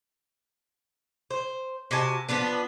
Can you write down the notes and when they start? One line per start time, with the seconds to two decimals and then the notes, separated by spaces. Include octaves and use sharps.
1.31 C5
1.91 C3 F#4 G#5 A5
2.29 F3 B3 D4 B4